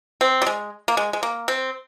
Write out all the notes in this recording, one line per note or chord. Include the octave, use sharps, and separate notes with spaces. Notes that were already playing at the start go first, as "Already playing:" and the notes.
C4
G3
G#3
A#3
G#3
G#3
A#3
C4